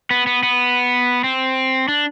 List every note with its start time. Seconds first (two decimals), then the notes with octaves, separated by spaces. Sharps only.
0.11 B3
0.27 B3
0.43 B3
1.24 C4
1.88 D4